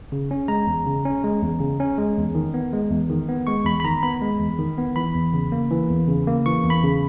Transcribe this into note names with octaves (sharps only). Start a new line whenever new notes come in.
C#3
C#4
G#3 A#5
E2
C#3
C#4
G#3
E2
C#3
C#4
G#3
E2
D#3
B3
G#3
E2
D#3
B3
G#3 C#6
E2 B5
B5
D#3 A#5
B3 B5
G#3
E2
D#3
B3
E3 B5
E2
C#3
A#3
E3
E2
C#3
A#3
E3 C#6
E2
B5
C#3